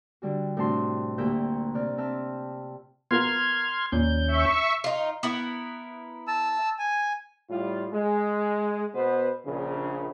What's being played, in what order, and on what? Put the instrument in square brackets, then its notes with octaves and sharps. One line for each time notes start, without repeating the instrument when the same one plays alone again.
[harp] D3 G3 F#4
A2 C3 D4 F#4 A5 C6
D2 A#2 G4 E5 A#5 G6
C3 D5 F6
C4 E5 A5 F6
[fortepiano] B3 F4 A#4 [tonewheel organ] C6 F6 G#6
[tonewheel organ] D#2 C#4 G6 [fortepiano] A#2
[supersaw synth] E5 C#6
[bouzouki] D#4 F4
B3 E4 A#4
[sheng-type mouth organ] A5 E6
G#5
[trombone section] A2 G3 F4
G#3
B2 B3 B4 C5
A#1 C#3